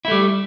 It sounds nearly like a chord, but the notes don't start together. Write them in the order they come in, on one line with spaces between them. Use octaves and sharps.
E4 A3 G3